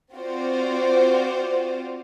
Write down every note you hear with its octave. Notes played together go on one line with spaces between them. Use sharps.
C4 F4 F#4 C5 D5